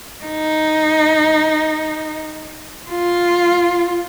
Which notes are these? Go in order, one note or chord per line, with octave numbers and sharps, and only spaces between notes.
D#4
F4